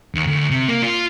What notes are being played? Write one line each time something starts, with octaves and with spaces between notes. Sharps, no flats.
D#2
D2
C3
A#3
F4